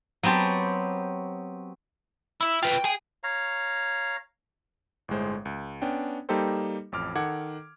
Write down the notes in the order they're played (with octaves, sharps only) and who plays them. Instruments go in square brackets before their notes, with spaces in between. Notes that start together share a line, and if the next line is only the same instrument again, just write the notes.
[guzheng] F#3 B3 C4 G4 A5
[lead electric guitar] E4 E5 [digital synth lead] E6
[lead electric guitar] F4 B4 [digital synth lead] G5
[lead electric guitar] G#4 G#5
[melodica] C#5 F5 A#5
[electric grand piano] G1 A2 G#3 C5
C#2
B3 C#4 D4 G5
G3 A#3 D#4 G4 A4 C5
A1 F2 D6 F6
D#3 A4 F#5 D6 G#6